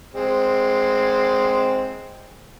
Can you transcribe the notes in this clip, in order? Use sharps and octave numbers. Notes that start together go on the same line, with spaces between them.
G#3 C4